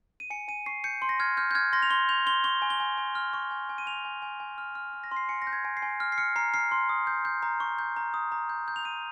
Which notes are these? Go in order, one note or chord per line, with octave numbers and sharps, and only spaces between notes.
D#7
G#5 C#7
G#5 D#7
C#6 C7
G6 C#7
C6
A#6
F6 G#6
F6 G6
G6
F6 G#6
C6 A#6
F7
C6 G7
G6 F7
C6 G7
C#6 G7
G#5
G7
G#5
G#5
F6
C#6
G#5
G#5
D#7
G#5 F7
G#5
G#5
G#5
F6
F6
F6
A#6
C6
C7
G#5 C#7
A#6
G6
G#6
G#5
C7
G#5
F6
C7
F6 C#7
A#5 C7
F6 C7
C6
D#6
G6
G6
A#5
C#6
G6
A#5
D#6
A#5
G6
G6
F7
G6 D#7